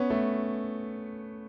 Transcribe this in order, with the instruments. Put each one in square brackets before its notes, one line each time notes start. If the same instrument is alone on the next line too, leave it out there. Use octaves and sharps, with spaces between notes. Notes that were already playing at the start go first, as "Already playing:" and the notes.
Already playing: [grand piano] B3 C#4
A3